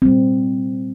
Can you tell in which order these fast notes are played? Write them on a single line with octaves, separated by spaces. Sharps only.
C4 G3 A#2